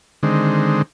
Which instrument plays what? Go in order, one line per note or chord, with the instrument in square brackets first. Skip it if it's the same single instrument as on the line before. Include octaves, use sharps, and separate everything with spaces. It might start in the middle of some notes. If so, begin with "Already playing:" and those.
[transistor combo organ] D3 D#3 G#3 C4